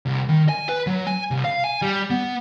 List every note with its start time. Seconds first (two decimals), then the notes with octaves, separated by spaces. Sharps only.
0.06 C2
0.29 D#3
0.49 G#5
0.69 B4
0.87 F#3
1.07 G#5
1.31 C2
1.44 F5
1.64 G#5
1.82 G3
2.10 B3